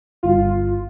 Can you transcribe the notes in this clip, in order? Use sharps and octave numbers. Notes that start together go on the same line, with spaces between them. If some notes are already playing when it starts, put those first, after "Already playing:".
G1 F4